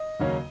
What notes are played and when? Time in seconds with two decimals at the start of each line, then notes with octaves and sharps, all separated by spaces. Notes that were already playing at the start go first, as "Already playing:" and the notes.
Already playing: D#5
0.20 D#2 C#3 F#3 A#3 C#4